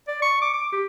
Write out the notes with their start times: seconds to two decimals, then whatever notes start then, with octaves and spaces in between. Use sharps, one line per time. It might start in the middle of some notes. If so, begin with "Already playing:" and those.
0.08 D5
0.22 C#6
0.42 D6
0.54 D6
0.73 G4